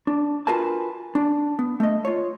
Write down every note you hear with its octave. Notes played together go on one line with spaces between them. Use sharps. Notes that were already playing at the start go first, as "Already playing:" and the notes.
D4
F4 F#4 A#4 B4 G#5 A5
D4
B3
A3 D#5
F4 C#5